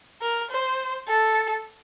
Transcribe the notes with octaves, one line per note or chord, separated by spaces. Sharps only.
A#4
C5
A4